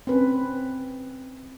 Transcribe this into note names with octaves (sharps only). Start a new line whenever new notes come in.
C4 C#4 B4